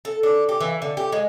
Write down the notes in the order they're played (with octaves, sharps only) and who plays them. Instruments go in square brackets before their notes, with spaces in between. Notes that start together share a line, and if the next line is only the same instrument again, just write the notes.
[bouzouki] A4
D4
G4
E3
D3
G4
G#3